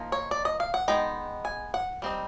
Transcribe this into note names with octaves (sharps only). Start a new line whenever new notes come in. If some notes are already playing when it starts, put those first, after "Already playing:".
Already playing: F3 A#3 D#4
C#5
D5
D#5
F5
F#5
G#3 B3 D#4 G5
G#5
F#5
G3 C4 D#4